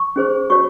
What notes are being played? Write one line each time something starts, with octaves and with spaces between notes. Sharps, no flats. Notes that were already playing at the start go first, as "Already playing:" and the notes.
Already playing: C#6
C#4 G#4 C5
F#4 C#5 C#6